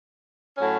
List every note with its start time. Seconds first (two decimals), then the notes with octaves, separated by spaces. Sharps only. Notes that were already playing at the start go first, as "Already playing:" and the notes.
0.56 A2 F#3 C#4